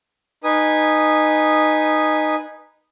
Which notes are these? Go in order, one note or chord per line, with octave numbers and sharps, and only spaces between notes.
D#4 B4 G#5 D#6